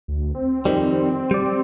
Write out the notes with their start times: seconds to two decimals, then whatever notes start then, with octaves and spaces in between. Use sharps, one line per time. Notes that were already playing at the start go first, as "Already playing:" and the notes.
0.08 D2
0.35 C4
0.65 F2 D#3 G3
1.31 G3 D5